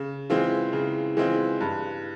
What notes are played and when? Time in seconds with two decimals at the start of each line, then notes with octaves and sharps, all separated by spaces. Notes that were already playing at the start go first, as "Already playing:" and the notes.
Already playing: C#3
0.30 E3 G#3 C4 F4
0.73 C#3
1.17 E3 G#3 C4 F4
1.60 G2